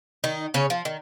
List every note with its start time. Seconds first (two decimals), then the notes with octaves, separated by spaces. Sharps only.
0.24 D#3 D#4
0.54 C#3 C#4
0.70 F3
0.85 D#3